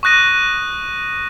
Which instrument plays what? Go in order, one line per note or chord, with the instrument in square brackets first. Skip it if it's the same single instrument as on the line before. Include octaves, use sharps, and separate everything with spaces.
[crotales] C#6 D#6 F#6 A#6 D#7